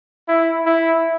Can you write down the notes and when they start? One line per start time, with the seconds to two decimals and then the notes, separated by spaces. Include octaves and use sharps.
0.28 E4
0.66 E4